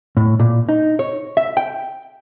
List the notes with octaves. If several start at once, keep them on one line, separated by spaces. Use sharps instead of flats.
A2
A#2
D#4
C#5
E5
G5